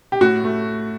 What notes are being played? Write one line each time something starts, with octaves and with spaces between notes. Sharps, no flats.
G4
A2 F#4
A3